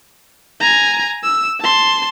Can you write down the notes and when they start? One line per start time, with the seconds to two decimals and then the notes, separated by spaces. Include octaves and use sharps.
0.60 G#5 A#5
1.23 E6
1.61 A5 C6